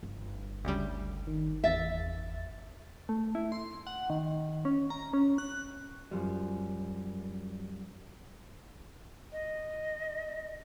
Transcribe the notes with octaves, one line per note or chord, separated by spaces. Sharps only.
G1
D2 C#3 G3
D#3
E2 E5 A6
A3
E4
C6
F#5
D#3
C#4
A#5
C#4
F#6
F#2 F3 G3
D#5